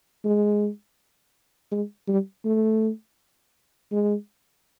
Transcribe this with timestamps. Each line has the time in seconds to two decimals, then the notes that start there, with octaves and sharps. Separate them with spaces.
0.24 G#3
1.71 G#3
2.07 G3
2.45 A3
3.92 G#3